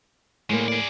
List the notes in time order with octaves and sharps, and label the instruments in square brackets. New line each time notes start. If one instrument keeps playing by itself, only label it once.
[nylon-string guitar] A2 A#3 [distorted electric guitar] G3 G#3
[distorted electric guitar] G#4 D5